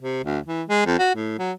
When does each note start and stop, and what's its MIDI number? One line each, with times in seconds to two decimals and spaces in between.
0.01 0.21 48
0.24 0.39 38
0.46 0.63 52
0.69 0.84 56
0.86 0.95 41
0.99 1.14 66
1.15 1.35 45
1.39 1.53 54